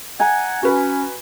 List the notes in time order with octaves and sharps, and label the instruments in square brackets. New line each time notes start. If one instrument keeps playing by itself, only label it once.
[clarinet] F#5 [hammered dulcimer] G#5 A#5
[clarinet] C#4 [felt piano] F#4 B4